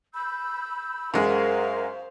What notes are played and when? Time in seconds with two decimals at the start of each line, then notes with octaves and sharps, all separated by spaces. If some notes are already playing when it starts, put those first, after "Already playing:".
0.14 B5 E6 G6
1.14 F#2 G#3 A#4 C5 F5 F#5